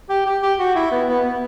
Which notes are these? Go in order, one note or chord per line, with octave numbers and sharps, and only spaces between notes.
G4
G4
G4
F#4
E4
B3
B3
B3